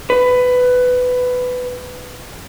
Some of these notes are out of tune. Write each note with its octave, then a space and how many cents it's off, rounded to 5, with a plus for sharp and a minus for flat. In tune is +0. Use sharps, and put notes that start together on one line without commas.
B4 +15